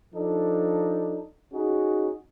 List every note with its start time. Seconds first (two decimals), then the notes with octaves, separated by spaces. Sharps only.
0.13 F3 D4 D#4 A4
1.51 C#4 D#4 F#4 G#4